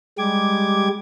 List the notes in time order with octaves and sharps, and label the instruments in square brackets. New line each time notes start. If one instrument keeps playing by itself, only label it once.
[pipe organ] G3 G#3 G4 D6 G#6